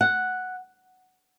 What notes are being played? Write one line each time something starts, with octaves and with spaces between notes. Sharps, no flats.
F#5